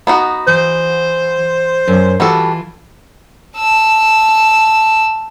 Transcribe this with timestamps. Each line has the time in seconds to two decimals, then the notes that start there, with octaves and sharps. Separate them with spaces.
0.07 B3 D#4 F#4
0.47 E3 C5
1.88 F#2
2.20 E3 G3 F4 F#4 A4
3.56 A5 E6